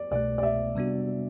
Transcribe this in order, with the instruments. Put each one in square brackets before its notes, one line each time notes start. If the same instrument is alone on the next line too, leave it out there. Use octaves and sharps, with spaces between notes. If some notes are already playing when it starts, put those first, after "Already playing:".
Already playing: [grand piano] D5
[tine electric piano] C2 B2 A3 [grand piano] D5
[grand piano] D5
E5
[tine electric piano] C3 G3 B3 D4 F#4